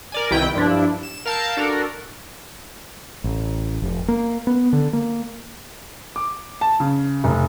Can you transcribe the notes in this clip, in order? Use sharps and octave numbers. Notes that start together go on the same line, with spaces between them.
A#4 D5 G#5
C2 D#3 E4 B4 G5
G2 F3 D4 E4
E7
A#4 F5 A5 E6 G6
D4 F#4 A4 A#4
A1
F1
A#3
B3
D3
A#3
D6
A5
C#3
F1